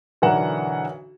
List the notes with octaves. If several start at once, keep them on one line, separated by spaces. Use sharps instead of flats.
B1 D3 E3 A#4 F#5 E7